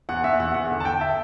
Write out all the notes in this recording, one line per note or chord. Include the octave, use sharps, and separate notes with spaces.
E2 F#5
E2 E5
E2 F#5
E2 F#5
D3
A5
D3 G5
E5